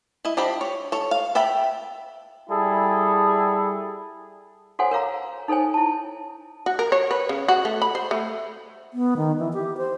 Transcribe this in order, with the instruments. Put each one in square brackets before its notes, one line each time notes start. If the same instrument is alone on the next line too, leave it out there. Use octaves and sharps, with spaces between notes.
[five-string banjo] E4 D#5
F3 D4 G4 D#5 B5
C#5
A4 C#5
F5
A4 E5 G5 B5
[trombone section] G3 E4 G#4 A4
[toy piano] F#4 A4 C5 C#5 F#5 G#5
A#4 C#5 F5 A#5
D#4 A4 C5 C#5 G#5
E4 A5
[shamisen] F#4
A#4
C#5
B4
C#3
F#4
A3
B5
C5
A3
[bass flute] B3
D#3
E3
G4
C5